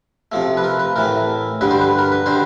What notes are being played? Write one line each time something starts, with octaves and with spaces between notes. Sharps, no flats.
C3 F3 A3
B4
A#4
B4
A2 E3 A3 A#4
G2 D3 G3 B4
C5
B4
A#4
B4
D3 G3 C5